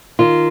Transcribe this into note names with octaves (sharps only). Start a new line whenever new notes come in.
D#3 F4